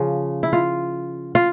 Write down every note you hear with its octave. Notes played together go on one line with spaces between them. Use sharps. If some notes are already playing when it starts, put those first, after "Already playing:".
Already playing: C#3 F3
E4
F4
F4